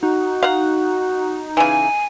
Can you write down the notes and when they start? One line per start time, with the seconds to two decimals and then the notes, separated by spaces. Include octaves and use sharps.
0.03 D#4 F#4
0.43 F5 F#5
1.57 C#3 E3 G#5